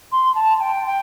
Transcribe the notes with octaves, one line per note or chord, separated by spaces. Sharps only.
C6
A5
A5
G5
G5